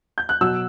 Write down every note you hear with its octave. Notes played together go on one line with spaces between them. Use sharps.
G6
F#6
B2 F#3 E6